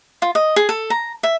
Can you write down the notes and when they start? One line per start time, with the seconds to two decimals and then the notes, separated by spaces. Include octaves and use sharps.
0.22 F4
0.35 D#5
0.56 G#4
0.69 A4
0.90 A#5
1.23 E5